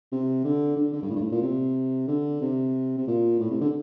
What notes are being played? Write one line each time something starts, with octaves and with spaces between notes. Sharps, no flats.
C3
D3
D3
D3
G2
A2
G2
A2
A#2
C3
D3
C3
C3
A#2
A2
C3
D3